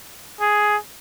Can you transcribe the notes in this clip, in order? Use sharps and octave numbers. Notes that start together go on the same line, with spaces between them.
G#4